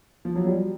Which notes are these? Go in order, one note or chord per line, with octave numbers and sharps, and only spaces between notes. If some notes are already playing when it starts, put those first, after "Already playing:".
F3
F#3
G3